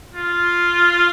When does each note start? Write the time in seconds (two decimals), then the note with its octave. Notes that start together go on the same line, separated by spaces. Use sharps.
0.15 F4